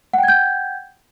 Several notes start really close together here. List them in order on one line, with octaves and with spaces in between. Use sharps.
F#5 G5 G#6 G6